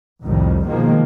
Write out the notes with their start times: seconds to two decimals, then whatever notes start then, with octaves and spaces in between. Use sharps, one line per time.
0.24 C2 F2 A2 D#3 G3
0.66 B2 D#3 F3 G#3 A#3